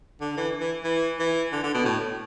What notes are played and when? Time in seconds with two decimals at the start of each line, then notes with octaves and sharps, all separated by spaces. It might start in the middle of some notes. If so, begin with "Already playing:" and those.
0.21 D3
0.37 E3
0.60 E3
0.84 E3
1.20 E3
1.52 D3
1.64 D3
1.74 B2
1.85 A2